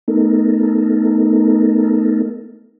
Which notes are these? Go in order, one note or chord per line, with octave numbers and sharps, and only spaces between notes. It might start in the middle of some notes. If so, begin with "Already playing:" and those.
A3 B3 D#4 A4 A#4